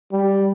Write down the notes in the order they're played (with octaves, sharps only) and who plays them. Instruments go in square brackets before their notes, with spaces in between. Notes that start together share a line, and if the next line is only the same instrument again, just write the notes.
[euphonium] G3